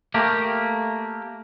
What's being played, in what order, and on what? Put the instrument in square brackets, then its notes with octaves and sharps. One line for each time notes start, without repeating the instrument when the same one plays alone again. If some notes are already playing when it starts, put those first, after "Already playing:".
[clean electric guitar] A3 A#3 G4